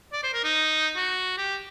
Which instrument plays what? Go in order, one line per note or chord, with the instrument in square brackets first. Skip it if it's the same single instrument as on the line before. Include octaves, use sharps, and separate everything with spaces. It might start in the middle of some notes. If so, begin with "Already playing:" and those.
[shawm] D5
C5
A#4
D#4
F#4
G4